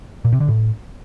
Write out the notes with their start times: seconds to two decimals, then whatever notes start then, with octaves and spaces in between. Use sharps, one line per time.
0.25 A#2
0.32 C3
0.40 D3
0.48 A2